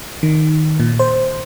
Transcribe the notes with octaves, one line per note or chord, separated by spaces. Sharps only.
D#3
A#2
C5